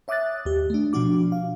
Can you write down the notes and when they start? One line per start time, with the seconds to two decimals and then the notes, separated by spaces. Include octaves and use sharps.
0.08 C#5 E5 D6 D#6 F#6 A6
0.45 D#2 G4
0.70 A3 D4
0.93 B2 F3 D4 F#4 D6
1.32 F5